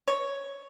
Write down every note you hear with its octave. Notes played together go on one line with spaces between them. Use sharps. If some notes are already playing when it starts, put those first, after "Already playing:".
C#5